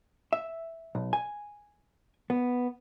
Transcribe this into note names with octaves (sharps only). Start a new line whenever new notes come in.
E5
B1
G#5
B3